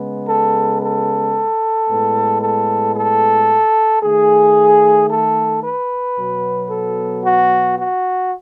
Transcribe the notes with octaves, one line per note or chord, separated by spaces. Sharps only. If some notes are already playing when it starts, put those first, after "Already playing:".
Already playing: C#3 G#3 B3
A4
A4
A2 G#3 B3
A4
A4
D#3 A3 G#4
A4
B4
B2 F#3 B3
A4
F#4
F#4